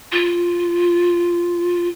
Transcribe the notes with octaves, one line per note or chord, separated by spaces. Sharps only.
F4